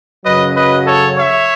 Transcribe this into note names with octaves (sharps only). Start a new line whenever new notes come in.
F#2 C#3 F#3 B4 D#5
B4 D#5
A4 C#5
C#5 E5